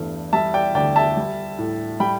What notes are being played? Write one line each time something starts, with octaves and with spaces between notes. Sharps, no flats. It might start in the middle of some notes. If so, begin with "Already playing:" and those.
Already playing: E2 G2 A3
G3 E5 A5
D5 G5
D2 D5 G5
E5 A5
G3
A2
G3 G5 B5